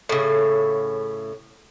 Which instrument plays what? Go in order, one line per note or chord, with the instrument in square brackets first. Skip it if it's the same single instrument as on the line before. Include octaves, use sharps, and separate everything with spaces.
[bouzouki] A2 C#3